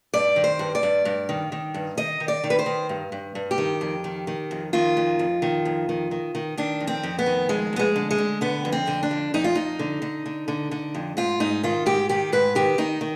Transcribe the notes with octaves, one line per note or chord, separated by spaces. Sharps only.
G2 D5
D#3
C5
G2
D5
G2
G2
D#3
D#3
G2
D#3 D#5
D#3
D5
D#3
B4
C5
D#3
G2
G2
G2
G4
D#3
F2
D#3
D#3
F2
D#3 F4
F2
F2
D#3
F2
D#3
D#3
D#3
D#3 D4
F2
C4
F2
B3
D#3
F2 G#3
F2 B3
G#3
D3
G#3
D3
D3 B3
F2
C4
D3
D4
F2
F2 D#4
F4
F2 D#4
D3
D3
D3
D3
D3
F2
G#2 F4
G#2 D#4
D#3 F4
G#2 G4
D#3 G4
G#2 B4
D#3 G4
D#3 D#4
D#3